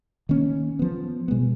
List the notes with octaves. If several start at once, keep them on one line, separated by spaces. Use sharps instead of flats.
D#3 A#3 C#4
F3 B3
B2 G#3 B3